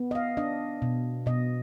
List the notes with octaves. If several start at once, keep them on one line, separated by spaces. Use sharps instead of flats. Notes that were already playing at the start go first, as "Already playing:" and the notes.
Already playing: B3
D#5
F5
D4 D#5
B2
B2 D#5